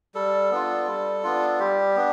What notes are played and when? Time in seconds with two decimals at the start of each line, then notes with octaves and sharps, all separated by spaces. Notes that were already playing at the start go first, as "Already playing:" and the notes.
0.15 G3 A4
0.51 B3 D4 F4
0.87 G3
1.23 B3 D4 F4
1.60 G3 G4
1.96 B3 D4